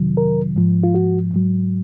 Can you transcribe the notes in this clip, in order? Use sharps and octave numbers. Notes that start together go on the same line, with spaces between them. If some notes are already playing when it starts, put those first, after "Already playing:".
Already playing: F2 C3 D#3 F#3
A#4
G#2 F3
F4
F#4
G#2 F#3